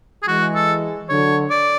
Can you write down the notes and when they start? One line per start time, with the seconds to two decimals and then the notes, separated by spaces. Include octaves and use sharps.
0.22 G#4
0.27 E3 G#3 F#4
0.55 A4
1.09 D3 F#3 C#5
1.50 D5